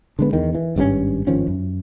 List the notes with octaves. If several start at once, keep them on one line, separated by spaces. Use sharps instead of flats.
D3 G#3 B3
E2 D#3
E3
G#1 G2 D3 C#4
G#1 D#3 F3 C#4
F#2